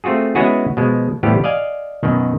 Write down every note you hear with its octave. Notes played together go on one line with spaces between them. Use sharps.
A3 C4 F4 F#4 G#4
G#3 B3 C#4 E4 F#4 G#4
B2 F3 G#3
A2 E3 F3 G3 B3 G4
D5 D#5 F5 G#5
F#2 B2 D#3